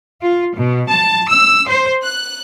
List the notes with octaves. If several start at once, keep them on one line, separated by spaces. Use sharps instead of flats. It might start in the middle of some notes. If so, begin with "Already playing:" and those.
F4
B2
A5
E6
C5
F#6